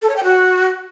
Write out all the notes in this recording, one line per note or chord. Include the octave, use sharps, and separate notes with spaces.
A4
C#5
G5
F#4